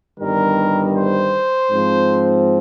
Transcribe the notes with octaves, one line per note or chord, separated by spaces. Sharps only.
G1 G2 D#3 G3 A#4
C5
G#2 F3 C4